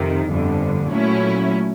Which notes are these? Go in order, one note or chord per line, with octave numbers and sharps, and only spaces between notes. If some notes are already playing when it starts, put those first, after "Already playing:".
Already playing: F2 C3 D#3
G1 F2 D3
A#2 F#3 A3 C#4 E4